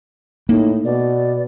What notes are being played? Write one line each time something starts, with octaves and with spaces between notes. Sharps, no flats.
A2 A#3 D#4
B2 D5